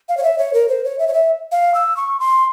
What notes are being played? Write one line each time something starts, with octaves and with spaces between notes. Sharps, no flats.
F5
C#5
E5
C#5
A#4
C5
C#5
E5
C#5
E5
F5
E6
C#6
C6